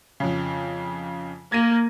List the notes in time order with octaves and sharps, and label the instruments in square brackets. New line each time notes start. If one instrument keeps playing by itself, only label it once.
[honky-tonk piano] F2 C#3
[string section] A#3 [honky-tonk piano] G#6 A#6 D#7